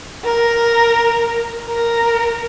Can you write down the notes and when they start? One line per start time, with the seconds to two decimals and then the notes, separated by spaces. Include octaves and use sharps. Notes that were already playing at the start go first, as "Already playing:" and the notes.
0.25 A#4
1.67 A#4